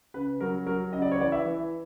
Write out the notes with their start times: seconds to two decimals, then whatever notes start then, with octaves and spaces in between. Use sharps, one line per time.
0.14 C#3 B4
0.40 F#3 A#4
0.66 F#3 A#4
0.93 C#3 D#5
1.02 D5
1.12 C#5
1.20 E3 D5
1.32 E5
1.45 E3